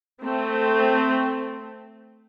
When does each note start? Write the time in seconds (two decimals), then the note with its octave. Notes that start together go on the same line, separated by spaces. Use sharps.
0.21 A3 C4